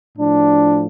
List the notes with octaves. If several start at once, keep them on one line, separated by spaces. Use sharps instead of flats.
A2 F3 D4